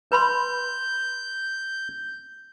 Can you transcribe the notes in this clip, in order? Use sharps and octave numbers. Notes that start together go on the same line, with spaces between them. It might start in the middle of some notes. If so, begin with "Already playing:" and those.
B4 B5 C6 G6